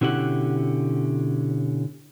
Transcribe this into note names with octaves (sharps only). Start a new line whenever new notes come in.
B2 D3 C#4 E4 G4 F#5